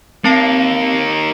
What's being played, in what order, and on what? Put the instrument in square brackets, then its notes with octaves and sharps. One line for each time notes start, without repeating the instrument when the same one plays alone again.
[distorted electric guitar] D#3 A#3 [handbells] C4 A5 C7